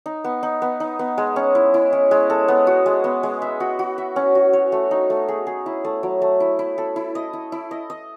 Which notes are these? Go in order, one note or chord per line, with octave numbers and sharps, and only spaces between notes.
D#4
B3
D#4
B3
D#4
B3
G#3
C#4
E4
E4
C#4
G#3
A4
B3
F#4
G#3
B3
G#3
E5
F#4
F#4
E5
C#4
F#4
C#5
A3
D#4
A3
G#4
G#4
E4
A3
F#3
A3
E4
E4
A4
E4
D#5
E4
E4
D#5
D#5